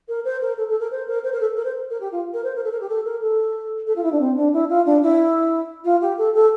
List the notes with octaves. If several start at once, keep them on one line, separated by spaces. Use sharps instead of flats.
A#4
C5
A#4
A4
A4
A#4
C5
A#4
C5
A#4
A4
A#4
C5
A#4
G4
F4
A#4
C5
A#4
A4
A#4
G4
A4
A#4
A4
A4
F4
E4
D4
C4
D4
E4
F4
D4
E4
F4
G4
A4
A4